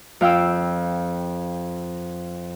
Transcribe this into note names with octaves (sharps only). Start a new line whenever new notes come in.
F2 F5 G5 E6